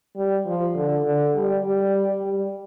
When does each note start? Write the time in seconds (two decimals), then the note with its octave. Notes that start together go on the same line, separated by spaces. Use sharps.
0.16 G3
0.46 F3
0.75 D3
1.04 D3
1.35 G3
1.64 G3
2.23 G3